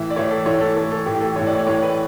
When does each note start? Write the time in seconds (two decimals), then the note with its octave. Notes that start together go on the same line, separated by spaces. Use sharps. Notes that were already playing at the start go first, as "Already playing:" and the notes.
Already playing: A2 E3 E5
0.10 D5
0.16 A2 E3 C#5
0.31 A4
0.46 A2 E3 C#5
0.61 A4
0.76 A2 E3 A4
0.91 A4
1.06 A2 E3 G4
1.21 A4
1.36 A2 E3 C#5
1.46 D5
1.55 C#5
1.67 A2 E3 C#5
1.82 B4